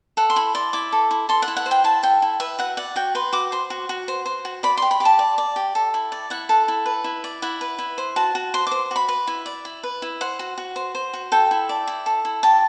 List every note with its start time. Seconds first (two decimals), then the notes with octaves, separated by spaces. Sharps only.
0.17 A4 F#5
0.30 C6
0.36 E4 B5
0.55 D5 C6
0.73 E4 D6
0.92 A4
1.11 E4
1.29 A4 C6
1.42 F#5
1.48 E4
1.57 F#5
1.66 C5
1.71 G5
1.84 E4 A5
2.03 A4 G5
2.22 E4
2.40 B4 E5
2.58 F#4 F#5
2.77 D5 F#5
2.96 F#4 G5
3.15 B4 C6
3.33 F#4 D6
3.52 C5 C6
3.70 F#4
3.89 F#4
4.08 C5
4.26 C5
4.45 F#4
4.63 D5 B5
4.77 G4 C6
4.91 B5
5.00 G4
5.05 A5
5.19 D5
5.38 D5
5.56 G4
5.75 A4
5.94 E4
6.12 D5
6.30 E4 F#5
6.49 A4
6.68 E4
6.86 B4
7.04 E4
7.24 D5
7.42 E4 F#5
7.61 B4
7.78 E4
7.98 C5
8.16 F#4 A5
8.35 F#4
8.54 C5 C6
8.67 C5 D6
8.91 F#4 B5
9.08 B4
9.27 E4
9.46 D5
9.65 E4
9.83 B4
10.02 E4
10.21 C5 F#5
10.39 F#4
10.58 F#4
10.76 C5
10.95 C5
11.13 F#4
11.32 A4 G5
11.51 E4
11.69 D5
11.88 E4
12.06 A4
12.25 E4
12.43 G4 A5